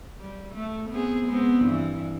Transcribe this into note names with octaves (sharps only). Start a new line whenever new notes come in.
G3
A3
B3 C4 G#4
G#3 B3 C4
G2 E3